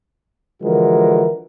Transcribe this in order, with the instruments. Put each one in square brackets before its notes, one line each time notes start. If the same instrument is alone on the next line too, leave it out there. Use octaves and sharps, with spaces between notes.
[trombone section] D3 E3 F3 G#3 F#4 A#4